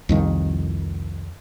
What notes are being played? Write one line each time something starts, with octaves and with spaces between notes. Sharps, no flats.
C2 F2 D#3